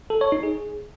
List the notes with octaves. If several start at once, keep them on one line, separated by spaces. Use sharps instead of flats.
A4
C#5
D#4
G#4